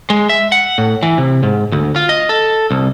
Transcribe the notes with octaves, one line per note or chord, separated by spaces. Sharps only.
G#3
E5
F#5
A2
E3
C3
G#2
D2
F4
D#5
A4
C2